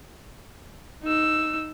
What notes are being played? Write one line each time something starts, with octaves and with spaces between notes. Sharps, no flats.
D#4 E6